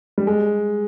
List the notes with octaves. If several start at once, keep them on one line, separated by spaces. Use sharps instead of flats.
G3
G#3